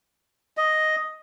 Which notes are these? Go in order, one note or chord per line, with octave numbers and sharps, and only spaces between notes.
D#5